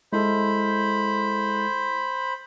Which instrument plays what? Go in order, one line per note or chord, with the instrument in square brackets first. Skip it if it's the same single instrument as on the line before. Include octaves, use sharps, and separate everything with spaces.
[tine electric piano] G#3 E4 A4 [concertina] C5 B5